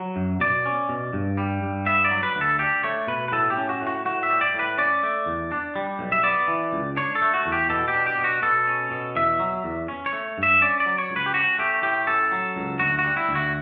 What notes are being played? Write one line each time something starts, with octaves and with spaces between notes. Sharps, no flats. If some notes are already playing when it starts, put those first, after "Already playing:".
Already playing: F#3
F#2
B2 D5
C#4
B2
G2
G3
G2
B3 E5
D5
F#3
B4
D2
A4
D4 G4
A3 C#5
B2 B4
B4
A2 A4
G4
C#4
F#4
A2
F#4
A2 F#4
E5
G3
D5
A2 B4
C#4 D5
A3
E2
D4
G3
B1
E5
B3 D5
E3
C#2
D4 C#5
A4
A3
F#4
E2
G4
B2 A4
G4
D4
G4
B2
F#4
B2 A4
C#4
B2
E2 E5
F#3
E2
C#4
C#5
A3
G2
E5
C#4 D5
D5
F#3
C#5
C#2
B4
G4
C#4 F#4
A3 G4
A2 G4
C#4 A4
F#3
C#2
D2 F#4
F#4
G3
E4
D2
F#4